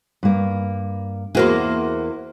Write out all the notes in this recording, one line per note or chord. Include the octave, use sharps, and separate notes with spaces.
G2 A#3
E2 A#3 E4 F#4 G#4 C5